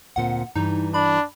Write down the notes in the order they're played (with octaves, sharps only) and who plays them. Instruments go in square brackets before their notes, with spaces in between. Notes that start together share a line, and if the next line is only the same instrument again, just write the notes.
[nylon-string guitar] D2 A#2 C4 [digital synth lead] F#5
[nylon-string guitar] G2 E3 [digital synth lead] D#4
[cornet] D4 [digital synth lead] B5